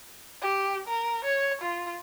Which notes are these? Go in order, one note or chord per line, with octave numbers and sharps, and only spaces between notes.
G4
A#4
C#5
F4